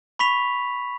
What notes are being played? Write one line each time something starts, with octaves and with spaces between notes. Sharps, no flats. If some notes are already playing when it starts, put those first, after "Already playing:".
B5 C#6 B6 F7